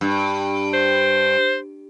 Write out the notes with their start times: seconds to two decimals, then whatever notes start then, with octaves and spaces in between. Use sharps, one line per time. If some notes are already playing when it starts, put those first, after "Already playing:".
0.01 G2
0.74 C5